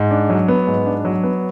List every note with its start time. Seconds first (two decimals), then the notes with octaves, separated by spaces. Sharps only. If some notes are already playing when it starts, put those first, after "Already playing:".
Already playing: G#2
0.11 D4
0.30 F#3
0.48 B3
0.67 G#2
0.86 D4
1.05 F#3
1.23 B3